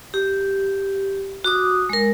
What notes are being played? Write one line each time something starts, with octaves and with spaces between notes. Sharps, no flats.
G4
F#4 D6 D#6
G#3 A#4